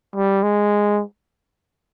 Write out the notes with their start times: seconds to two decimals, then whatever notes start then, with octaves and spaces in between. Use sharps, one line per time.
0.16 G3
0.43 G#3